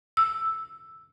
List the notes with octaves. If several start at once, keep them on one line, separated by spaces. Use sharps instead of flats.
E6